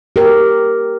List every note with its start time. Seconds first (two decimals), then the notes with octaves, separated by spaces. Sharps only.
0.16 G4 A#4